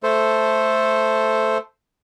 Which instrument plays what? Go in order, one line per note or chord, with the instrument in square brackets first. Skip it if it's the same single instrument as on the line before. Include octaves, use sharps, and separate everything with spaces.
[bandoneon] A3 A4 C5